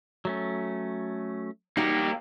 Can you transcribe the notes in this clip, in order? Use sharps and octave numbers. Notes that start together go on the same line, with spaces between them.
F#3 A3 C#4
G3 A#3 D#4 F#4 G4